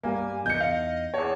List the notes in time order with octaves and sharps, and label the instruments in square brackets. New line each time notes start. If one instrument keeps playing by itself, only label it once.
[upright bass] G2 [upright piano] G3 A#3 [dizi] G#5
[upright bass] E2 D#4 [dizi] D#5 [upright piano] G6 C#7
[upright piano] F5
[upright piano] E2 C#5 [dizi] A5